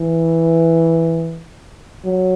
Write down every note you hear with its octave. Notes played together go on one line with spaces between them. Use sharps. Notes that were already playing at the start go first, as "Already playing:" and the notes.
Already playing: E3
F#3